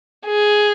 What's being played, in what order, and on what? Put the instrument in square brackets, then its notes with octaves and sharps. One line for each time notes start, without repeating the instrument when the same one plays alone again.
[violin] G#4